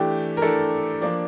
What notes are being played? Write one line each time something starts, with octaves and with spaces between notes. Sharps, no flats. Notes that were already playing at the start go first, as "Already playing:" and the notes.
Already playing: E3 A3 D4 G4
A#4
E3 A3 D4 A4
F3 A#3 D4 D5